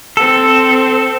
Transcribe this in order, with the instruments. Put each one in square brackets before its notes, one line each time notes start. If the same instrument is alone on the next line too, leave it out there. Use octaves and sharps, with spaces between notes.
[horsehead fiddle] C4 [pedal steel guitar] A4